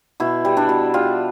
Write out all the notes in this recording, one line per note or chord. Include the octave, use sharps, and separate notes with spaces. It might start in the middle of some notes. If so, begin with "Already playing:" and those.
B2 E4
G3
D4
B2
G3 F4